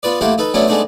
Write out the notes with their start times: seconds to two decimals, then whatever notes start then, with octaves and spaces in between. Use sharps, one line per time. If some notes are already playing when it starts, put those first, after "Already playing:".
0.03 B3 F4 B4 D5
0.21 A3 A#3 E4 G4 C5 F#5
0.38 D#4 A4 B4
0.54 F#3 A3 B3 C#4 D4 E4
0.67 G#3 A3 B3 D4 D#4 C5